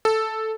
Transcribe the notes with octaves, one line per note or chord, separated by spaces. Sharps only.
A4